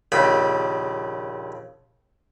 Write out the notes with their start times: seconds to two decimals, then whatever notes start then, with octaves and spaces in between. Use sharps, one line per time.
0.12 A#1 D#2 C#3 B5